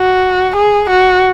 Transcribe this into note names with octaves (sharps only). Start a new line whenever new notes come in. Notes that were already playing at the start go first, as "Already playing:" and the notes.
Already playing: F#4
G#4
F#4